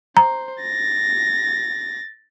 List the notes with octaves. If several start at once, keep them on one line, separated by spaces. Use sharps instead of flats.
C5 A#5
A6 A#6